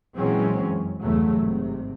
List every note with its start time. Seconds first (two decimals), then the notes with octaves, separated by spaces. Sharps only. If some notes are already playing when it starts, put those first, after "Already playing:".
0.15 A#1 E3 F#3 G#3 C4 C#4
0.63 F#2
1.02 E2 G2 C#3 E3 F#3 A3
1.40 G#1 C3